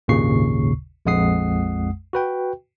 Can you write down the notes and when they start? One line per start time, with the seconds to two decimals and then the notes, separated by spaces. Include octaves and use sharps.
0.08 G#1 D#2 A#2 C#3 C#6 C7
1.06 A#1 F2 G#3 F#5 D#6 C7
2.13 F#4 B4 G5